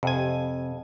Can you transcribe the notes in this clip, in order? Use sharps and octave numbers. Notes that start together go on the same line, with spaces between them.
F2 C3 G#5